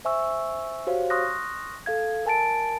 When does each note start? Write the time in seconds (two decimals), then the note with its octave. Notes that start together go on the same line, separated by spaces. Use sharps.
0.05 C5 E5 G#5 C#6 E6
0.87 F#4 G4 C5 C#5 F5
1.10 C6 C#6 D#6 F6 F#6 A#6
1.86 A4 F5 G#6
2.26 A#4 G#5 A5 A6 D7